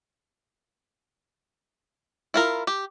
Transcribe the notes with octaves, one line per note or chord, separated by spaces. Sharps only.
E4 F4 A#4
G4